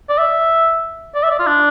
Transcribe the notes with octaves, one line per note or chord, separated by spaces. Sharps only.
D5
E5
D5
E5
D5
F4
D4